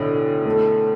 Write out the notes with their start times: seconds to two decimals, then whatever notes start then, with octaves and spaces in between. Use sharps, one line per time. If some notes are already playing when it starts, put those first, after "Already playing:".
Already playing: B1 A2 D3
0.46 A3